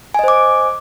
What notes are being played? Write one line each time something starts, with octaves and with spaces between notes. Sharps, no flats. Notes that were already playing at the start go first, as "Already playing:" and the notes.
C5 D#5 G#5 D6